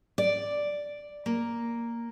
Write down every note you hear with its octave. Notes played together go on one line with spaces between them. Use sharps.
D5
A#3